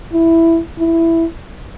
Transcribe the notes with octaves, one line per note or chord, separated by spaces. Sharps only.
E4
E4